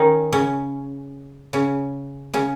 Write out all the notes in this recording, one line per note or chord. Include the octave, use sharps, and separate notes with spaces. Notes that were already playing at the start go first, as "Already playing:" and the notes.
Already playing: D#3 C#4 D#4
C#3 C#4
C#3 C#4
C#3 C#4